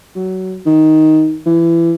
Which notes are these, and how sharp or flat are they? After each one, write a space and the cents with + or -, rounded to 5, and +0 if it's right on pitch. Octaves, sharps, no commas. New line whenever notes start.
F#3 +20
D#3 +5
E3 +25